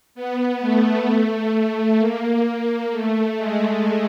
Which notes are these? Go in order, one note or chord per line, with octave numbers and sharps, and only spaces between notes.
B3
A3
A#3
A3
G#3